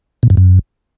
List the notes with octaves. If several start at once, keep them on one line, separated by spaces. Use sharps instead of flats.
A#2
G2
F#2